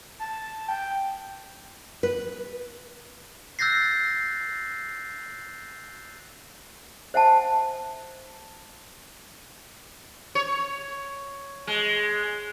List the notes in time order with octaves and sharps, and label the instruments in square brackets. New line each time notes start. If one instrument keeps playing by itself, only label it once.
[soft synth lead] A5
G5
[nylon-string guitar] B4
[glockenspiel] E6 F#6 G6 A6 A#6 C7
[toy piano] C5 E5 F#5 G#5 A5
[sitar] C#5
G#3